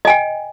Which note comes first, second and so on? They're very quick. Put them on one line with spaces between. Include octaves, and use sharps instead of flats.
D#5 G#5 G5